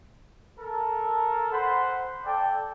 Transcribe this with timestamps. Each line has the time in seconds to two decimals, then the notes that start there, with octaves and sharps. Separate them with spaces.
0.59 A4 A#4
1.52 C5 F#5 B5 C6
2.26 A4 D5 G5